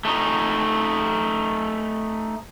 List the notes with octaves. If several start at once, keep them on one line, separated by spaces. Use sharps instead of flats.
A3 D#4